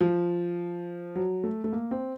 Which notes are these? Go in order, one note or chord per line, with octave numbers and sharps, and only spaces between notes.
F3
F#3
A3
A3
A#3
C4